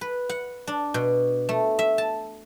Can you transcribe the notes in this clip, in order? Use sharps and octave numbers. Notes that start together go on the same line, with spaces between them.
B4
F#5
D4
B2
A3
E5
A5